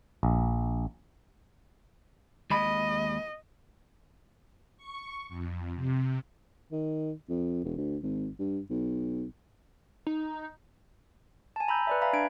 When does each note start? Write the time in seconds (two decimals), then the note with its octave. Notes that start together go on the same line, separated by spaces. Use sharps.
0.23 A#1
2.50 D#2 G#3 D#5 B5
4.77 C#6
5.28 F2
5.76 C3
6.72 D#3
7.30 F2
7.64 E1
7.77 D2
8.03 G#1
8.39 G2
8.70 B1
10.07 D#4
11.56 G#5 A5
11.68 A#5 B5 E6 G6
11.87 B4 D5 E5
12.02 E5 F5 G#5 A#5 B5
12.13 D4 G#6 D7